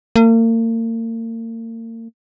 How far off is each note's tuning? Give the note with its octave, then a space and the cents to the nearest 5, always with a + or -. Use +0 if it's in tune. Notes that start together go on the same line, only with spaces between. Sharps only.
A#3 -40